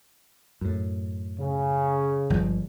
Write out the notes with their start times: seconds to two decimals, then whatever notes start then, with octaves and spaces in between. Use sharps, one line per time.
0.61 F#2 A2
1.38 C#3
2.30 G1 F3 G#3